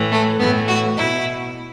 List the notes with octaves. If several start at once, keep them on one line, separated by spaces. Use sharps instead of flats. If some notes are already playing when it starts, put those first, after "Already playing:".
Already playing: A2 E3
A3
A2 E3 B3
F#4
B2 E4